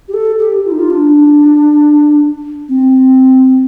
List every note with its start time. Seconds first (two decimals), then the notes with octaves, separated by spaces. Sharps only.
0.08 G4
0.14 A4
0.39 G4
0.65 F4
0.71 D#4
0.79 F4
0.90 D4
2.69 C4